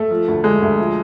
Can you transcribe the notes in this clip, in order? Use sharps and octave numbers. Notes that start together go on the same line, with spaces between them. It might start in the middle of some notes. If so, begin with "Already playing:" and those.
Already playing: A3
F3
D2
D3 G#3
D2
F3